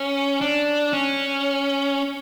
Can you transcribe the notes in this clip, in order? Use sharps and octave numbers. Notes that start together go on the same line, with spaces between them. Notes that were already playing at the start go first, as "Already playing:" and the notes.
Already playing: C#4
D4
C#4